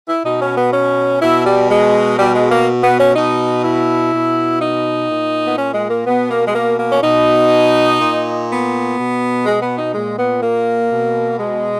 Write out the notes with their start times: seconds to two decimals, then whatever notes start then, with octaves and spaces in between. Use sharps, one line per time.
0.09 E4
0.25 B2 D#4
0.42 C#4
0.58 B3
0.73 C#4
1.22 B2 E4
1.46 G3
1.71 G#3
2.19 B2 G3
2.35 G#3
2.52 A#3
2.84 B3
3.00 C#4
3.16 B2 D#4
3.64 E4
4.13 B2
4.61 D#4
5.10 A#2
5.47 B3
5.58 C#4
5.74 G#3
5.90 A#3
6.07 B2 B3
6.31 A#3
6.48 G#3
6.55 A#3
6.79 A#3
6.92 C#4
7.04 B2 D#4
8.00 A#2
8.49 B3
8.98 B2
9.46 G#3
9.62 B3
9.78 D#4
9.94 A#2 G#3
10.19 B3
10.43 A#3
10.91 B2
11.40 G#3